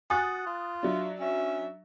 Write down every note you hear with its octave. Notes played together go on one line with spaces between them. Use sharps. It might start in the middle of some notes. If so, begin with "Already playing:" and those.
F#4 G#5 D#6 F#6 A6
F4
F#3 D4 E5
C#4 E5